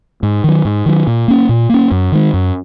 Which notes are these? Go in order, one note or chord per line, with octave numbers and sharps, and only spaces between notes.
G#2
D#3 F#3
G#2
D#3 F#3
A#2
A#3 C#4
A#2
A#3 C#4
F#2
D#3 G#3
F#2